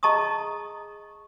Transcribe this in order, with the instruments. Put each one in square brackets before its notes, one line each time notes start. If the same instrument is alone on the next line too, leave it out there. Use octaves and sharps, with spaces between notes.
[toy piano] G#4 D#5 A5 A#5 C#6 D#6